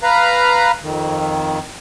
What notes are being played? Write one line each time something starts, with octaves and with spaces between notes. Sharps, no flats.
B4 F5 A#5
F2 D#3